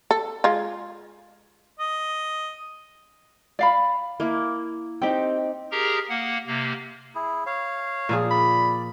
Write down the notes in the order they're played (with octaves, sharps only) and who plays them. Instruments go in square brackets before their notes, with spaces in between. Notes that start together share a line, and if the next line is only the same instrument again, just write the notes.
[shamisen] A4
G#3 F4
[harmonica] D#5
[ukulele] D5 F5 B5
[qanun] A#3 E4
[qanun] C4 D#4 [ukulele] G4 G5
[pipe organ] G4 G#4 A#4 A#5
A#3 F#5
C3 A#3
[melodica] E4 G#4
C#5 F5
[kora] A#2 F3 G#4
[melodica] D5 [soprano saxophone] B5